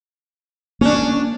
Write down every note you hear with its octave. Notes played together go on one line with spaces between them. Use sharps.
A#3 C#4 D4